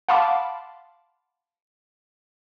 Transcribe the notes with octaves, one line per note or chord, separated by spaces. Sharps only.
F5 F#5 A5 B5 C6 D6